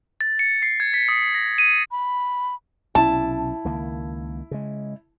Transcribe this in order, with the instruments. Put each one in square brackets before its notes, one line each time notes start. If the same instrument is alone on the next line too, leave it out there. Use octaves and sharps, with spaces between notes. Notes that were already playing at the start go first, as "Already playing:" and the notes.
[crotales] A6
C#7
C7
G#6
B6
D#6
A#6
D#7
[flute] B5
[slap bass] B1 C3 C#4 [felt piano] E4 [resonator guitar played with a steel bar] A5
[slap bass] C#2 D#3 A#3
C#3 G#3